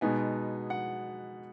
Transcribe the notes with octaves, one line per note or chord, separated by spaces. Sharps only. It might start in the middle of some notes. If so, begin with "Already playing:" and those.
B2 G#3 B3 D#4 G#5
F#5